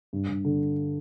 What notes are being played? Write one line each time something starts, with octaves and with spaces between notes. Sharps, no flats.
G2
G2
D3